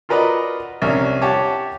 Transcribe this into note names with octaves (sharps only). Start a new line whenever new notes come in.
F4 F#4 A#4 B4 D5 D#5
C2 C#4 D4 A#4 F6
G4 C#5 F#5 A5 D6